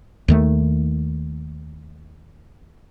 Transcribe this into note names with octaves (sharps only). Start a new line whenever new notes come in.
D#2 D#3 A3